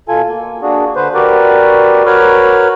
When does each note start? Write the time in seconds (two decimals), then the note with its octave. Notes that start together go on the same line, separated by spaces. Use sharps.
0.08 B2 F4 A4 G#5
0.29 A#3
0.62 A#3 D4 F#4 G#4
0.96 D3 B4 C5
1.14 F#4 G4 A#4 B4 D5
2.06 F#4 A#4 B4 C#5 B5 F6